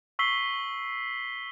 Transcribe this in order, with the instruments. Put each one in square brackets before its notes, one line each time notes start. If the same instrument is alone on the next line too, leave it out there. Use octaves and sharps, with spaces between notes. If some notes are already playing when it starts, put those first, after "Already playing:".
[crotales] C#6 E6 B6 C7 G7